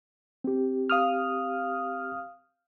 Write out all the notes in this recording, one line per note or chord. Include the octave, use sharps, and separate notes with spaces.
C4 G4
F5 D#6 F6